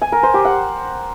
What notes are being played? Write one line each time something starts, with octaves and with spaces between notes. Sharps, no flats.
G#5
A#4
C5
G4
F#5